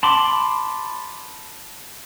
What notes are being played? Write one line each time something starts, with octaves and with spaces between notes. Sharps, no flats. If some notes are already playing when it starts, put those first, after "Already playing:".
A5 B5 C6 D6